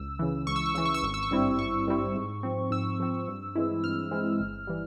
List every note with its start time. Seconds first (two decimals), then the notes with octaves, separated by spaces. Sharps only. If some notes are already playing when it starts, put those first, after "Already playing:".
Already playing: C#2 E6
0.19 C#3 E3
0.47 C#2 C#6
0.56 E6
0.66 C#6
0.75 C#3 E3 E6
0.85 C#6
0.94 E6
1.03 G#1 C#6
1.14 E6
1.23 C#6
1.31 G2 G3 C4 E4
1.59 G#1 C#6
1.87 G2 G3 C4 E4
2.15 G#2
2.43 F3 C4
2.71 G#2 E6
3.00 F3 C4
3.28 G2
3.55 E3 G#3 C4 E4
3.84 G2 F6
4.11 E3 G#3 C4 E4
4.40 G1
4.67 E3 G3